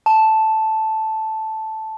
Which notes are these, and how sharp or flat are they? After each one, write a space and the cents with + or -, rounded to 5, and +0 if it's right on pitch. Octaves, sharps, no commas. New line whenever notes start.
A5 -5